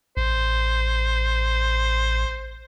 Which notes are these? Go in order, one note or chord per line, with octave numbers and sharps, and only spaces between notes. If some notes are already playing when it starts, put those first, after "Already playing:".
A1 C5